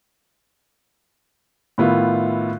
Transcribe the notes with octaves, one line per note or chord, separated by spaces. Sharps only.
A2 D#3 B3 E4 F4